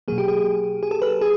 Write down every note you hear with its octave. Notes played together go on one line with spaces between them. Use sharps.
B2 F#3 A#3 G#4
G4
G#4
G#4
A4
B4
G#4